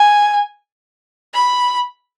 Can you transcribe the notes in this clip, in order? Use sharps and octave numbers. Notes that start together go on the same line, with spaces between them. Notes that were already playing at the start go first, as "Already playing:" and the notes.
Already playing: G#5
B5